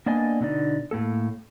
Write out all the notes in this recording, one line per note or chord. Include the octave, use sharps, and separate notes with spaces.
A#3 B3 D4 D5 D#5 G#5
B2 D3 D#4 D5
A2 A#3 A4